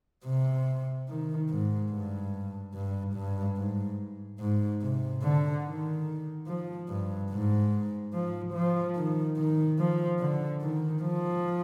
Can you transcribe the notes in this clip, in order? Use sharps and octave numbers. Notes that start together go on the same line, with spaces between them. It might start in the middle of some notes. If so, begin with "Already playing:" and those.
C3
D#3
G#2
G2
G2
G2
G#2
G#2
C3
D3
D#3
F3
G2
G#2
F3
F3
D#3
D#3
F3
D3
D#3
F3